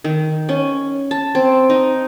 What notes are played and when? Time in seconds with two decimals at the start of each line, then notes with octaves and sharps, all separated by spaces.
0.04 D#3
0.49 C#4
1.11 A5
1.35 C4
1.70 D#4